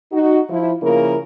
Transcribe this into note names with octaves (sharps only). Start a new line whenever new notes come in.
D#4 F#4
F3 E4
C#3 F3 A#3 E4 A#4